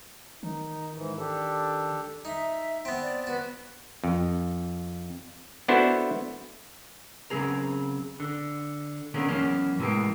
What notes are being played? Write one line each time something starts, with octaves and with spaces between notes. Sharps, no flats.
D#3 D#4
G#2 E3
D4 G4 A4
D#4 E5
B3 C4
D5
B3 F#4
F2
B3 D4 E4 F#4 A4 C5
C#3 F3 F#3 C4 G#4 A#4
D3
B2 D3 D#3 A#3 C#4 G#4
E2 F#3 A#3 C#4
A2 C3 E3 F3 G#3 A#3